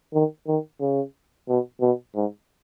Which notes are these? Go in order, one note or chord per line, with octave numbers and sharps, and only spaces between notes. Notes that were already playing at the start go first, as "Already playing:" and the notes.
D#3
D#3
C#3
B2
B2
G#2